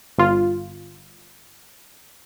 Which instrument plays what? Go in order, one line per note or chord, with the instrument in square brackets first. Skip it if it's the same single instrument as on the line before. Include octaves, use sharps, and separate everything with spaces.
[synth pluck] G1 F4